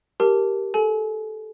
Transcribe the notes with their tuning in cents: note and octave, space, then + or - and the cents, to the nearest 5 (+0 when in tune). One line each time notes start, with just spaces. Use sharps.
G4 +0 A#4 +0 A5 +0
A4 -15 G#5 +35